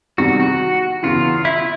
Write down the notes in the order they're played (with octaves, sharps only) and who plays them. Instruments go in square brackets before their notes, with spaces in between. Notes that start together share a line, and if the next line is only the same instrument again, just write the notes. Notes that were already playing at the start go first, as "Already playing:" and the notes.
[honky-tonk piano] E2 C3 D#3 G3 [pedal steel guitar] F#4
[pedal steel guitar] F#4
[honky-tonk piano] E2 C#3 E3 [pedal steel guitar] F4
[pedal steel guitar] E4